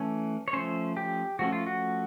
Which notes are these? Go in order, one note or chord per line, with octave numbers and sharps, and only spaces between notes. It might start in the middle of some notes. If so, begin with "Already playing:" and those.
Already playing: E3 A3 C#4
C#5
F3 A3 C#4 C5
G4
F3 A3 C#4 F#4
F4
F#4